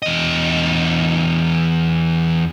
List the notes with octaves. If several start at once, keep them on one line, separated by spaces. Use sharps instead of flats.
E2 D#5